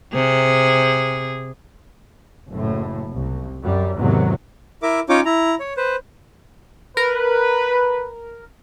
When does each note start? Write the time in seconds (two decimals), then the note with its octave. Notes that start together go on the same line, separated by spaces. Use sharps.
0.13 C3 G#4
2.50 F#1 A2
3.12 C2
3.62 F#2 G3
3.97 E2 G#2 C3 D#3 E3 F#3
4.83 E4 A#4 E5 D6
5.09 C#4 D#4 F4 C#5 D6
5.25 E4 A#5
5.60 C#5
5.77 B4 C5
6.97 A#4 B4